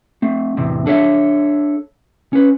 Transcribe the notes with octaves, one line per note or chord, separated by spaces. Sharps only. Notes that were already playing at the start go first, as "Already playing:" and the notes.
A3 C4
E2 A2 C3 C4
D4 A4 C#5 E5
C#4 B4